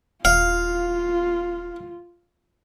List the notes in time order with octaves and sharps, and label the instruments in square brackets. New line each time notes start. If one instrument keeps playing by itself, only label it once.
[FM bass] D#1 [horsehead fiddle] F4 [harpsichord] F5